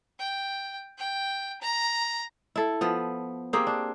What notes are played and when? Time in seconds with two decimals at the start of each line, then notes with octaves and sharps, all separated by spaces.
0.19 G5
0.98 G5
1.61 A#5
2.56 E4 A4
2.81 F3 B3
3.53 A#3 C4 G4 G#4
3.67 D4